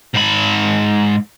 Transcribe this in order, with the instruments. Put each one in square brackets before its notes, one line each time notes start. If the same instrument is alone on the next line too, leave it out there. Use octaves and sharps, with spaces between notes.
[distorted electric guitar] G#2 B5